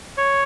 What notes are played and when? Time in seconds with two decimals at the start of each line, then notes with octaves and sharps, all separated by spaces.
0.17 C#5